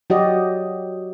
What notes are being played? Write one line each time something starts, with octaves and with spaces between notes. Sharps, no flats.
F#3 F#4 G4 D5 D#5